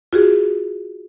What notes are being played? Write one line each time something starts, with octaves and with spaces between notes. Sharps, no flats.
F4 F#4 G#4